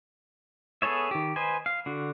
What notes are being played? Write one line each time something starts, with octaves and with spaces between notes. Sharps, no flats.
B3 G#4 A4 C#5 E5
D#3 G4
B4 C5 D#5 G#5
F5
D3 F#4